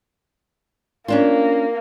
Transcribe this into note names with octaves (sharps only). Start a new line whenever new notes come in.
A#3 C#4 D4 F4